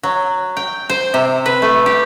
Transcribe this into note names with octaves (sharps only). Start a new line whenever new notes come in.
F#3
G5
C5
C3
B4
A3
G4